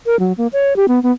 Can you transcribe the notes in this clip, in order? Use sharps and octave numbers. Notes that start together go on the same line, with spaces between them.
A#4
F#3
A#3
C#5
G4
B3
B3